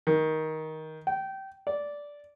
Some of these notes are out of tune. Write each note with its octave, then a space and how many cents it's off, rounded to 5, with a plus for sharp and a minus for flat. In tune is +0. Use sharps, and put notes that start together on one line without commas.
D#3 +15
G5 -20
D5 -10